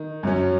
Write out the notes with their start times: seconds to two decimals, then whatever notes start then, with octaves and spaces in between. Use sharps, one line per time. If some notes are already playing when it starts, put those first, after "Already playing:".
Already playing: D#3
0.23 F#2 F#3 C#4